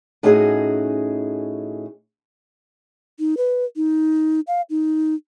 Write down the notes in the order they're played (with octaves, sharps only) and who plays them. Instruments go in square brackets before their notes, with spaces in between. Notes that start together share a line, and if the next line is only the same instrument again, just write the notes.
[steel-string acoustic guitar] A2 C#4 D#4 F#4 G#4 D#5
[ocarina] D#4
B4
D#4
F5
D#4